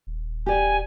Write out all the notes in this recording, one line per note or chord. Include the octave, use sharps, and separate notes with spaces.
D#1
G4 D5 G#5